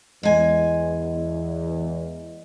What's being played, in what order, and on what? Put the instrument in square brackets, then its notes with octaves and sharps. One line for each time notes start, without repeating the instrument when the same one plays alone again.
[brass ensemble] E2 [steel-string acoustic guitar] G#3 G#5